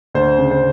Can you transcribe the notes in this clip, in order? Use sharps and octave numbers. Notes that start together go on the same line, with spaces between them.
D2 C5
C#3
C5